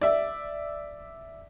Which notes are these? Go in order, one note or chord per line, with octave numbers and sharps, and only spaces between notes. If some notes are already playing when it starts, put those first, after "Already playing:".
D5 E5